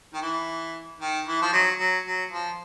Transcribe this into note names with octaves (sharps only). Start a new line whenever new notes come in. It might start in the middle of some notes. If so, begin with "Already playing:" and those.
D#3
E3
D#3
E3
F3
D#3 F#3
F#3
F#3
F3